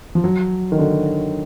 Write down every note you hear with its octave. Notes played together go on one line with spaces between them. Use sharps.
F3
F#3
D#3
D3